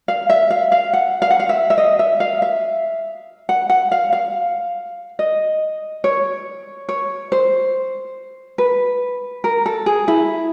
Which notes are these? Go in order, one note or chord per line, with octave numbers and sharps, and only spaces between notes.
F5
E5
F5
F5
F#5
F5
F#5
F5
E5
E5
D#5
E5
F5
E5
F#5
F#5
F5
F5
D#5
C#5
C#5
C5
B4
A#4
A4
G#4
E4